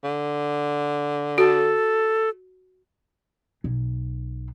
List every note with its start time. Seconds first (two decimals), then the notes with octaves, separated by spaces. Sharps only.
0.03 D3
1.38 F#4 A4
3.64 B1